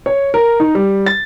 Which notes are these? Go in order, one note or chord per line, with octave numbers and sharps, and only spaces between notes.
C#5
A#4
D#4
G3
A6